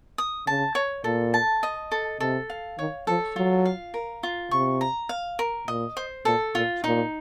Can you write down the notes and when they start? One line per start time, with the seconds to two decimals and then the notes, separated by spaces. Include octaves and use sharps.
0.18 D#6
0.47 C#3 A5
0.75 C#5
1.04 A#2 A4
1.34 A5
1.63 D#5
1.92 A4
2.20 C3 A4
2.50 F5
2.78 D#3 C#5
3.07 F3 A4
3.36 F#3 F4
3.65 F5
3.94 A#4
4.23 F4
4.51 C3 C#6
4.81 A#5
5.09 F5
5.39 A#4
5.67 A#2 D#5
5.97 C5
6.25 A#2 A4
6.55 A#2 F4
6.84 A#2 D#4